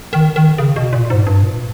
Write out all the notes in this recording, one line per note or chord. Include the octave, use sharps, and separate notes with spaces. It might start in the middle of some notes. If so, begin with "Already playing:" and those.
D#3
D#3
C#3
B2
A#2
G#2
G2
A#2